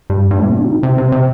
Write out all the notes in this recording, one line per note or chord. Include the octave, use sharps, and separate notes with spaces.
G2
G2
A2
A#2
C3
D3
F#3
D#3
C3
C3
C3